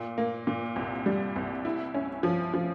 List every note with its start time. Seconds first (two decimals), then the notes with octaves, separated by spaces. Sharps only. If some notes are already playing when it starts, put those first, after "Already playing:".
Already playing: A#2
0.18 A#3
0.47 A#2
0.76 C2
1.06 G3
1.36 C2
1.65 E4
1.94 C#4
2.23 F3
2.54 F3